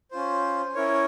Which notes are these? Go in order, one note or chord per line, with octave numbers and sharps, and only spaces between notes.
C#4 F4 C5
C#4 E4 A#4 C#5